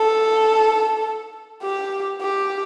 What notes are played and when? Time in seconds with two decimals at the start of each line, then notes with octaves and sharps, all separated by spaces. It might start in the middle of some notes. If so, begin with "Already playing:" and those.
Already playing: A4
1.63 G4
2.21 G4